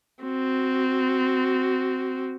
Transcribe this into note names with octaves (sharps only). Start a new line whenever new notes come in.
C4 F#4